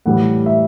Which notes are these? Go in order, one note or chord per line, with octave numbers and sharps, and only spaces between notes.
A2 E3 G3 F#5
E5